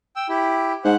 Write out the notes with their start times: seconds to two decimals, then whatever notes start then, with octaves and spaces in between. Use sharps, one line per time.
0.16 G5 E6
0.29 E4 G4
0.85 G#2 C5 F#5